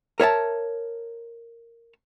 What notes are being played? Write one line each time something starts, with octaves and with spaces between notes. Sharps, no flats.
A#4 C#5 E5 A5